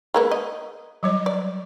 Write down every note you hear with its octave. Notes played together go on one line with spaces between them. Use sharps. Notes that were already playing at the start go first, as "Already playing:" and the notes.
G#3 A#3 B3
D#5
F#3 G3 C#5
D5